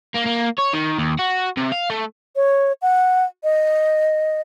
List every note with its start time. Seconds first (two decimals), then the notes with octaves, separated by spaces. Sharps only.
0.15 A#3
0.26 A#3
0.59 C#5
0.74 D#3
0.98 D#2
1.19 F#4
1.57 C3
1.72 F5
1.90 A3
2.35 C#5
2.82 F#5
3.44 D#5